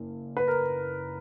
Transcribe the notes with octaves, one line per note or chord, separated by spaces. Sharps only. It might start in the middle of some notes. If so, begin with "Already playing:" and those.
Already playing: F#1
B4
A#4